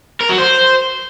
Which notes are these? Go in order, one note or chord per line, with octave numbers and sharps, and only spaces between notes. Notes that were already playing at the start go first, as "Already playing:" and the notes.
A#4
F#3
C5